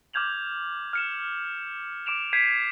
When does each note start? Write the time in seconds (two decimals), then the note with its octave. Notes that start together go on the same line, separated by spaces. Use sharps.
0.14 D6 F6 G6 G#6 F7 F#7
0.93 F6 C#7 E7
2.06 D6 D7 E7 F7
2.33 G6 G#6 B6 C7 D7 D#7